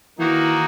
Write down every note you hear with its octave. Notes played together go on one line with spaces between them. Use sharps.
D#3 E3 A#3 D#4 F#4